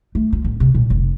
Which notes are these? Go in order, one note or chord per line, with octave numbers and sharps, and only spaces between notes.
A3
F4
A1
C3
A#2
F1